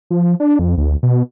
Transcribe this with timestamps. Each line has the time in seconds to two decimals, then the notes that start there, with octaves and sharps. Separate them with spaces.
0.10 F3
0.40 D4
0.59 F2
0.77 D2
1.03 B2